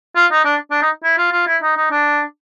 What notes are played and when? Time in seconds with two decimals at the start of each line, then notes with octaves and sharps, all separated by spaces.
0.15 F4
0.31 D#4
0.45 D4
0.71 D4
0.82 D#4
1.04 E4
1.18 F4
1.32 F4
1.47 E4
1.62 D#4
1.76 D#4
1.91 D4